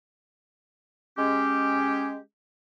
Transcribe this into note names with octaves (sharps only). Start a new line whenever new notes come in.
G#3 C#4 G4